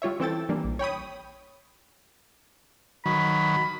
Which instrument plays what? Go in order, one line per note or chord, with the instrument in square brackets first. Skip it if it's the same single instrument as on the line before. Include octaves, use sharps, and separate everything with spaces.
[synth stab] G3 F4 C#5 E5
E3 C4 E4 A4 G5 A6
E3 G3 A#3 D4
A#1
C#5 G5 B5 D#6
[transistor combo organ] D#3 F#3 [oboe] B5